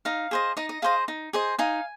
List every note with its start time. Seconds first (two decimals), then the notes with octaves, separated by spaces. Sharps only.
0.05 D#4 F5
0.31 G#4 C5 D#5
0.57 D#4 D#5
0.69 D#5
0.82 G#4 C5 D#5 F5
1.08 D#4
1.33 G#4 C5 D#5
1.59 D#4 F5 G#5